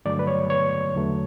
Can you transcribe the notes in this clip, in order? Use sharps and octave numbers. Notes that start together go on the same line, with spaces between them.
G2 D3 F#3 A3 D5
B4
C#5
C#5
E2 D3 F#3 A3